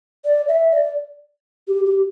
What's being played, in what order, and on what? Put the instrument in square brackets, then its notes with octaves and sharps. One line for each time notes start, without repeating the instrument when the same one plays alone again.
[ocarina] D5
E5
D5
G4
G4